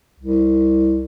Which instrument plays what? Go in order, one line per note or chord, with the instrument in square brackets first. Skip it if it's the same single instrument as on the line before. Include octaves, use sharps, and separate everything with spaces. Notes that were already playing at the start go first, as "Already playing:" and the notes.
[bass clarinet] C2